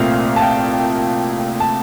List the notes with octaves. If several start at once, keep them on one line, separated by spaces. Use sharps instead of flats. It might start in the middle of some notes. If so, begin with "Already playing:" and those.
Already playing: C2 A#2 A3 C4 F5
A5
G5
A5